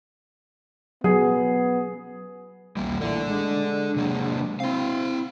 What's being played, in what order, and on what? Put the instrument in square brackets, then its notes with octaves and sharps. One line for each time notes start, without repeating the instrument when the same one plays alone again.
[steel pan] F#3 [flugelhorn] B3 [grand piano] G#4
[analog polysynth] B1 E2 [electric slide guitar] G3 A#3
[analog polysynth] A#2 E3 A3 [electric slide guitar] A4 D5
[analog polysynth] G#3 D4
[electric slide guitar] C3 F#3 A#3
[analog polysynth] C4 [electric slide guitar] E4 F5